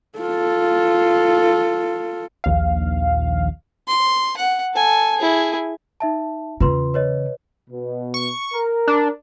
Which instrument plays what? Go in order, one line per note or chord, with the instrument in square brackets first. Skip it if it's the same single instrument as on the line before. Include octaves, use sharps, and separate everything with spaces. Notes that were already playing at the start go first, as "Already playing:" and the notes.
[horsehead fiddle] F4 A4
[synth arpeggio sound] A#1 D#2 F5
[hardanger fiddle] C6
F#5
A4 G#5
E4 G#4
[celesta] D#4 E5 A5
[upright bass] E2 C#3 [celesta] F4 B4 C6
[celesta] B4 C#5 D#5
[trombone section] B2
[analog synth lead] C#6
[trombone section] A#4
[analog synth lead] D4